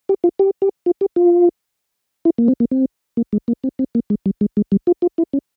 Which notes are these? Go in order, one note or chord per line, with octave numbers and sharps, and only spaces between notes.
G4
F4
G4
G4
F4
G4
F4
E4
A#3
C4
A#3
C4
A#3
G#3
A#3
C4
C4
A#3
G#3
G3
G#3
G#3
G3
F4
F4
E4
C#4